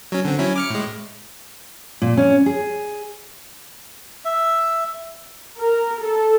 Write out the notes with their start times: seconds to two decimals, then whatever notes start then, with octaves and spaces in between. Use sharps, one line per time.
0.12 F#3 C#4
0.25 D3 C4
0.39 F#3 C#4 E4
0.56 D6 F6 C#7
0.70 A2 G#3
2.02 A#2
2.17 C#4
2.46 G#4
4.25 E5
5.56 A#4
6.02 A4